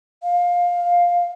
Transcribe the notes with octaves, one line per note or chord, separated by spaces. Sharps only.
F5